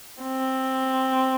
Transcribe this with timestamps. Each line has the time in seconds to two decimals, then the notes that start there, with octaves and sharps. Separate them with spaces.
0.23 C4